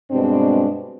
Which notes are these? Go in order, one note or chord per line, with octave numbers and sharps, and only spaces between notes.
G2 B2 G#3 C4 D4